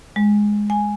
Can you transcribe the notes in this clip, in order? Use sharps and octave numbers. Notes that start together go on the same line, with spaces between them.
G#3
G#5